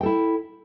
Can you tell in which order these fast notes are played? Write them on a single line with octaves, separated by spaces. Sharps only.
G5 A4 E4